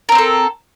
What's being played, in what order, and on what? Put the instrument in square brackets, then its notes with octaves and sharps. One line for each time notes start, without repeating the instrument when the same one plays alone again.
[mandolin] A#4
C4
C5
A4